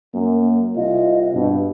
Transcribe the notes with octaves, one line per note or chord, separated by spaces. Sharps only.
F#2 A#3
C2 F4 D#5
G2 B2